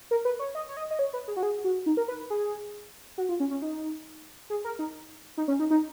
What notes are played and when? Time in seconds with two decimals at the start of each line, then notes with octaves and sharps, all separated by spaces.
0.11 A#4
0.25 B4
0.39 C#5
0.55 D#5
0.69 C#5
0.77 D#5
0.91 D#5
0.99 C#5
1.13 B4
1.28 G#4
1.37 F#4
1.43 G#4
1.64 F#4
1.86 D#4
1.97 A#4
2.08 B4
2.19 B4
2.30 G#4
3.18 F#4
3.29 F4
3.40 C#4
3.51 C#4
3.62 D#4
4.50 G#4
4.64 A#4
4.79 D#4
5.37 D#4
5.48 C#4
5.59 D#4
5.71 D#4